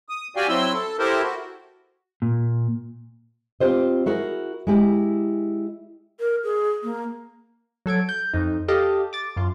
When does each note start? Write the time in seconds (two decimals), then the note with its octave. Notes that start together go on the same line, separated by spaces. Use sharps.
0.09 D#6
0.36 F#4 G4 D5 F5 G5 G#5
0.48 F#3 C4 E4 C6 E6
0.73 A4
0.98 E4 G4 A4 A#4 C5
1.22 F#4
2.22 A#2
3.60 C4 F4 G4 C5 D#5
4.06 E4 F#4 G#4 A#4
4.67 G#3 E4 G4
6.20 A#4
6.44 G#4
6.83 A#3
7.86 F#3 A4 G#6 D7
8.09 G6
8.34 F2 D#4
8.68 G4 A4 D#5 F5 A5
9.13 D6 A6
9.36 F#2 F4